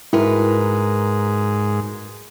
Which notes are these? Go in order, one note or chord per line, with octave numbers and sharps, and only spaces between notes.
G#2 E4 F#4 A#4 B4